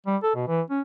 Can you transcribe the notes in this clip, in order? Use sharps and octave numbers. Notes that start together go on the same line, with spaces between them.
G3
A4
B2
E3
C#4